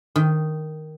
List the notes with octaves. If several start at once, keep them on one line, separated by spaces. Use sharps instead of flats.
D#3